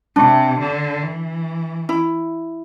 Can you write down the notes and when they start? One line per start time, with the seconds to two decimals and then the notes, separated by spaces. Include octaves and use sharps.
0.16 C3 D4
0.59 D3
1.02 E3
1.89 E4